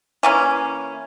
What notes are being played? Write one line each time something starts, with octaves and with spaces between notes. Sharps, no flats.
E3 A#3 C#4